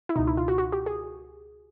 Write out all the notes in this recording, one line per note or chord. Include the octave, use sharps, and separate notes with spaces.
E4
C#2 B2 D#4
E4
F4
F#4
F#4
G4
G#4